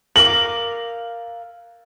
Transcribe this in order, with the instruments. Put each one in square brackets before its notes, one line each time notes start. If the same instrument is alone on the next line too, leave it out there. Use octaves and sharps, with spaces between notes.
[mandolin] A#4 F5 D6 [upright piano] F#7